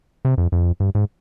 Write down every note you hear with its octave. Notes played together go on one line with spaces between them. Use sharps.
C3
F2
F2
G2
G#2